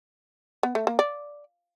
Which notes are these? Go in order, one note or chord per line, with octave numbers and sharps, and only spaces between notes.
B3
A3
A#3
D5